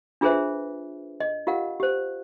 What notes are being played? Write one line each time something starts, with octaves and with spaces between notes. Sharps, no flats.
D4 F4 G#4 B4 C5 E5
D#5
F4 G4 A#4 F5 F#5
G4 C5